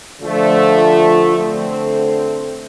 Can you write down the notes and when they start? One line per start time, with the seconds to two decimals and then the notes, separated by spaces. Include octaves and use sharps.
0.20 D3 F3 A3
1.35 D3 A3 C4